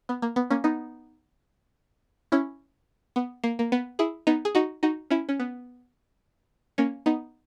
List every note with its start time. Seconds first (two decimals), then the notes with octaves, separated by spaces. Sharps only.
0.09 B3
0.22 A#3
0.36 B3
0.50 A#3 C#4
0.64 B3 D#4
2.32 C#4 E4
3.16 B3
3.44 A#3
3.59 A#3
3.72 B3
3.99 E4 G#4
4.27 B3 D#4
4.45 G#4
4.55 D#4 F#4
4.83 D#4 F#4
5.10 C#4 E4
5.29 C#4
5.40 B3
6.78 A#3 C#4
7.06 B3 D#4